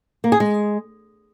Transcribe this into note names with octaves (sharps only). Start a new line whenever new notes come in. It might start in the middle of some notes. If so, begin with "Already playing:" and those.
A#3
G#4
G#3